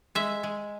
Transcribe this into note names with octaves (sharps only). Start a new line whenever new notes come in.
G#3 E5
G#3